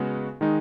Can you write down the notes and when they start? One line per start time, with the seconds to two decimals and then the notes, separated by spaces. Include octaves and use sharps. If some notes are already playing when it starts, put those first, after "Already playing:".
Already playing: C#3 G#3 B3 F#4
0.41 D#3 G#3 D#4